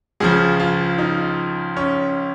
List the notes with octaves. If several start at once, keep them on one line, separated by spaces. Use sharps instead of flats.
C#2 C#3 F3 G#4
F4
D#4
C#4